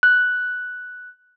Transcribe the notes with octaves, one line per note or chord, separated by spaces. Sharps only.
F#6